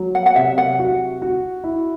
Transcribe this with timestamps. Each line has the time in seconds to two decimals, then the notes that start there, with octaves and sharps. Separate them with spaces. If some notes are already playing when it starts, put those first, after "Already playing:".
Already playing: F#3
0.15 F#5
0.26 F#5
0.36 C3 E5
0.58 F#5
0.79 F#4
1.22 F#4
1.64 E4